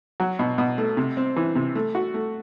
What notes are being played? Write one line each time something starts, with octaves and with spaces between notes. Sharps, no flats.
F#3
B2
B2
A3
C3
C4
E3
C3
A3
F#4
A3